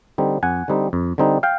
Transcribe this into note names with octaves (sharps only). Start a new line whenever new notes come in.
D3 G3 C4 D#4
F2 F#5 G#5
D3 G3 C4 D#4
F2
D3 G3 C4 D#4
F5 G5